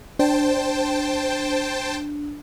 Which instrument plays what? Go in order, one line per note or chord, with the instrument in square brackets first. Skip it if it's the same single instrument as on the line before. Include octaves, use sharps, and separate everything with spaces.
[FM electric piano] D4 [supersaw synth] C5 G5 A5